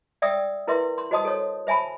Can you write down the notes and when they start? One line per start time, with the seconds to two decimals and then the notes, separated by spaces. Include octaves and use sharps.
0.22 D5 E5 G5 D#6 E6
0.67 E4 A#4 B4 E5 C6
0.98 C6
1.11 F#4 C5 D#5 A5 D#6
1.25 A4 C#5
1.67 C5 E5 G#5 A5 B5